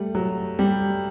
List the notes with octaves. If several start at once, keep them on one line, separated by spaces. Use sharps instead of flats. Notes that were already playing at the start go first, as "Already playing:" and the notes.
Already playing: G3 A3
F#3
G3